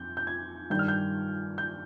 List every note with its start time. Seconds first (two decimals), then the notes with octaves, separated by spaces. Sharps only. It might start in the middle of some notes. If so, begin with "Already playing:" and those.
Already playing: F2 G6
0.17 G6
0.27 G#6
0.70 G2 D#3 G3 D4 G6
0.79 F6
0.88 G6
1.58 G6